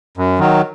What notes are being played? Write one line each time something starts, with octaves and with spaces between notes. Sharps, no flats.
F#2
D#3 F#3